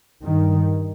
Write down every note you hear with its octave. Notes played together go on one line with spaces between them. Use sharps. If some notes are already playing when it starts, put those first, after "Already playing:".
G2 D#3